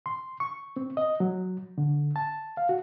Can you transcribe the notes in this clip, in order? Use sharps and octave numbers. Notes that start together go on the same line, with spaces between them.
C6
C#6
C4
D#5
F#3
D3
A5
F5
F#4